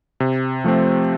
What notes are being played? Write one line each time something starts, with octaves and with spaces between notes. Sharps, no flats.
C3
F3 A3 C4